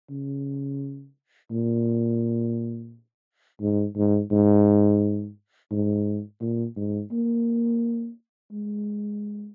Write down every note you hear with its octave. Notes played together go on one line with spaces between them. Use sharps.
C#3
A#2
G#2
G#2
G#2
G#2
A#2
G#2
A#3
G#3